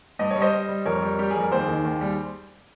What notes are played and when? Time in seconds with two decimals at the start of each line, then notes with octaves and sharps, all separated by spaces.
0.19 G2 D#5
0.31 C#5
0.36 G3
0.42 C5 D#5
0.52 G3
0.69 G3
0.86 F2 A#4 C#5
1.02 G3
1.19 G3 G4
1.30 F2 G#4
1.41 A#4
1.51 D#2 G#4 C5
1.68 D#3
1.85 D#2
2.01 G3